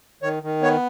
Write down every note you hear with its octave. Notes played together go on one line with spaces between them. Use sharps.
D#3 C#5
D#3
B3 C#5